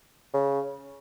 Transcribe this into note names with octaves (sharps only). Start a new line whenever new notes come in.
C#3